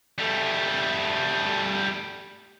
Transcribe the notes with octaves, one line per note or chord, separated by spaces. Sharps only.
G3 A3